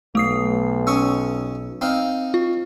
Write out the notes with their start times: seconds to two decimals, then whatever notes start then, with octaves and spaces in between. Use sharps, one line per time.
0.15 B1 A3 D#6 C7
0.87 C#4 C#6 D#6 E6
1.81 C4 D#4 F5
2.34 F4